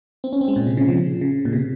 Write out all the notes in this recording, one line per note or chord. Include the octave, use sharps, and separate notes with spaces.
C4
C#4
C4
G#3
A#2
C3
C#3
F3
C#3
A#2
C3